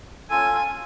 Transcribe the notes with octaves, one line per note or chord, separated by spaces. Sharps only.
C#4 F4 A4 G#5